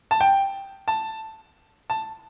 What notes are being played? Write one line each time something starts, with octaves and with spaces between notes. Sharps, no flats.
A5
G5
A5
A5